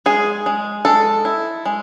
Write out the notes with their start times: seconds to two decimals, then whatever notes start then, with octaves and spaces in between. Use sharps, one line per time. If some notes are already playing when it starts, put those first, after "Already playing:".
0.06 G#3 G#4
0.46 G#3
0.85 G#3 A4
1.25 E4
1.66 G#3